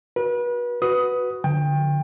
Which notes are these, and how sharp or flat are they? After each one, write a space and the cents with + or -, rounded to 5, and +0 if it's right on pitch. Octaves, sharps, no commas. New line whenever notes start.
F#4 +0 B4 -35
F#4 +0 B4 +0 D#6 +15
D3 +0 F3 +35 G5 +25